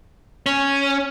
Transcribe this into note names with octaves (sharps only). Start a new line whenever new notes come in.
C#4